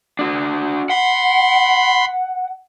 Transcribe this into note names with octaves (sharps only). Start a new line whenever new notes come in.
D4 F#4
F#5 B5 C6